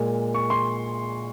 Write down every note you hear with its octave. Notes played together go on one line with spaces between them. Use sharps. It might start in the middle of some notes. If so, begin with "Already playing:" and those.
Already playing: A#2 G#3
C#6
C6